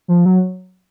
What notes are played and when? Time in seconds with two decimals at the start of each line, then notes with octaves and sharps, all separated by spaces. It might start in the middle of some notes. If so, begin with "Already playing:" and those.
0.08 F3
0.26 F#3